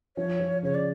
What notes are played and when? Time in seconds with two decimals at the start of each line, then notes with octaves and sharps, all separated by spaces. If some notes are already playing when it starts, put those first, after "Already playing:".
0.17 F3 C#5
0.40 F3
0.63 C#3 C#5
0.75 D5